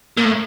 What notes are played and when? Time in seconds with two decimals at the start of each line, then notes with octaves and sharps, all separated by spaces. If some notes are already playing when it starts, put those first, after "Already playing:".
0.18 A#2
0.25 A2